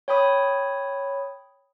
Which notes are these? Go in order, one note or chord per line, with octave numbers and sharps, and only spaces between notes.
C#5 G5 B5 D#6